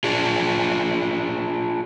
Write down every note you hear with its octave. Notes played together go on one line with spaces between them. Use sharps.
D4 F4 G#4